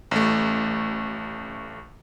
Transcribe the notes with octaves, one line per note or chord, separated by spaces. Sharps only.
A1 A3